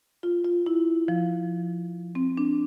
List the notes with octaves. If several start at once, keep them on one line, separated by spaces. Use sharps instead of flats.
F4
F4
E4
F3
C4
D4